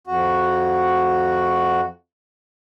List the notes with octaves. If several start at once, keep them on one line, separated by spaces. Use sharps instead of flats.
F2 F#4